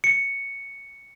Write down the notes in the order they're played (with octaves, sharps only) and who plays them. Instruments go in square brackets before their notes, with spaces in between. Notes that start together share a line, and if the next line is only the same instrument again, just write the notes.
[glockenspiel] C#7